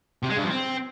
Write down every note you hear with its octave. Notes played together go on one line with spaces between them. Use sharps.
C3
G#3
G2
F3
C4